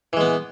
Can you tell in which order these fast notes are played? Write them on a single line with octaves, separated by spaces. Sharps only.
E3 G#3 B3